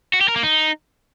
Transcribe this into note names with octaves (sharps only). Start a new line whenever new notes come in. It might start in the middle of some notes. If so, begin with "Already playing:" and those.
F#4
G4
A#4
A#3
D#4